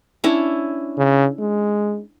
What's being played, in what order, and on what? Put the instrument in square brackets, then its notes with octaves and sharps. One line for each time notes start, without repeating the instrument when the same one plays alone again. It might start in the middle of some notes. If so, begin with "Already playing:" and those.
[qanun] C#4 D4 E4
[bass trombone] C#3
G#3